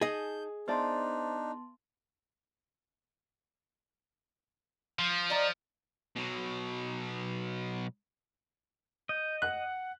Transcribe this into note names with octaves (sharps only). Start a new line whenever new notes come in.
D#4 G#4 D#5 G#5 A5 G6
B3 D4 D#4 C5 D5 E5 A5 C6
F3
D5 D#5 A#5
B2 F#3
D#5 G6
F#5 F#6